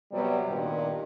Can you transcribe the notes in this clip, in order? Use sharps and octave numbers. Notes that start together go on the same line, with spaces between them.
C3 F#3 G3 B3
G2 A#2 D#3